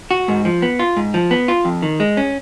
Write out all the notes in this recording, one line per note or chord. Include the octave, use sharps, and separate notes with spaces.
F#4
G#2
F3
B3
F4
G#2
F3
B3
F4
F2
D#3
G#3
C#4